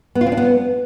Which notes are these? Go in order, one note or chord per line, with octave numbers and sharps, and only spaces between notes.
B3
F4
C4
D4
B3